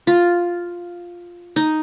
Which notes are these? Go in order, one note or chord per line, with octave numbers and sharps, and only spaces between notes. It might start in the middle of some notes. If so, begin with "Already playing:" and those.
F4
D#4